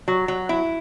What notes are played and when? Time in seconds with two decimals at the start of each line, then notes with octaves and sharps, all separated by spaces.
0.08 F#3
0.28 F#3
0.49 E4